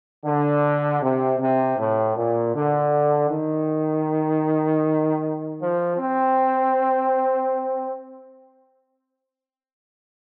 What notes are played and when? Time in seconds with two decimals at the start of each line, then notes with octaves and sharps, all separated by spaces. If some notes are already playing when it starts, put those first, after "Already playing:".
0.25 D3
1.02 C3
1.39 C3
1.78 A2
2.16 A#2
2.54 D3
3.30 D#3
5.59 F3
5.96 C4